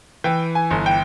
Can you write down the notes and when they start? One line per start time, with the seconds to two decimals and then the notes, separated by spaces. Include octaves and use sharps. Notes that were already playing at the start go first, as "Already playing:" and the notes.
0.24 E3 G5
0.55 G#5
0.71 G1
0.86 G5